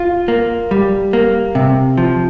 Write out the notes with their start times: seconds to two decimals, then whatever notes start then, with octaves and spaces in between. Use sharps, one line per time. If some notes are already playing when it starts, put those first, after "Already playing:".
Already playing: F4
0.28 A#3
0.71 G3
1.13 A#3
1.55 C3
1.97 F3